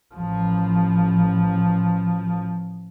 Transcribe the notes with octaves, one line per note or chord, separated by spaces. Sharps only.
A1 F3